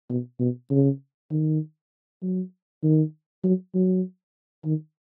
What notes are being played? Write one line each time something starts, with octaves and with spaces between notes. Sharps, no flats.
B2
B2
C#3
D#3
F#3
D#3
F#3
F#3
D#3